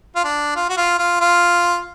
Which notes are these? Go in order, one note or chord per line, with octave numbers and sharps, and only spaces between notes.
F4
D4
F4
F#4
F4
F4
F4